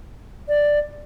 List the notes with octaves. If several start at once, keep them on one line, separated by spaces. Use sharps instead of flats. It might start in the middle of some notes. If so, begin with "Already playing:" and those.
D5